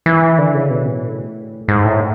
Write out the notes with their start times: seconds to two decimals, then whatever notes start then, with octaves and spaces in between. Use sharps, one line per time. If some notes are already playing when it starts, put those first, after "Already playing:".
0.06 E3
0.38 D3
0.54 C#3
0.70 B2
0.88 A2
1.68 G#2
1.85 A2